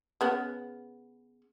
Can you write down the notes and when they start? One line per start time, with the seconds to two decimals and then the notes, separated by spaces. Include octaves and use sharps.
0.21 C#3 B3 F#5